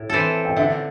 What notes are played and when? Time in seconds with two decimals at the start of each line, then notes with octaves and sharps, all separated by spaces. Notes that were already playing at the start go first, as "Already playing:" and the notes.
Already playing: A2
0.10 E3 C4 A4
0.45 G5
0.57 D3 E5